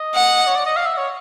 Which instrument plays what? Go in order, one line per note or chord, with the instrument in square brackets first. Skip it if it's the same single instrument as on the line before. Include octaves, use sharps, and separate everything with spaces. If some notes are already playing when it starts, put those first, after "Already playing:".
Already playing: [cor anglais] D#5
[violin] F#5
[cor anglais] C#5
D5
D#5
F5
E5
C#5